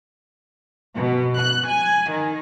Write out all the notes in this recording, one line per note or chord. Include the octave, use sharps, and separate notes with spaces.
B2
F#6
G#5
D#3